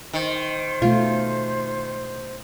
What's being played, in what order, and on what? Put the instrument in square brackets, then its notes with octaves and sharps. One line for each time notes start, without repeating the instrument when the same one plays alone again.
[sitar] D#3 [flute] C5
[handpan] B2 A3 [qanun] F4